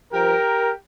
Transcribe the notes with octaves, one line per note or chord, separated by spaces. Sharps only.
G2 F3 G4 A#4